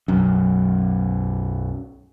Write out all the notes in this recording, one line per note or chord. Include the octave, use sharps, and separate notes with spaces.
B1 F#2